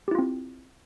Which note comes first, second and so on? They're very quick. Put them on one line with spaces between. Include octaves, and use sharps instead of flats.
G4 E4 F4 C4